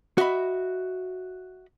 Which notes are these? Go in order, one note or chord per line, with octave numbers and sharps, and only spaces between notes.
F#4 D#5 E5 B5